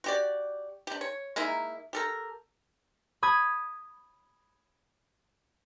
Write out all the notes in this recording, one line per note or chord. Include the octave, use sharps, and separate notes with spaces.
F#4 G4 D5
D4 G4
C#5
G#3 A#3 D#4 E4
G4 A4 A#4
B5 D#6 G#6